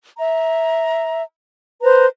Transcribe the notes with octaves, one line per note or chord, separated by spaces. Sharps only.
E5 A#5
B4 C5 A#5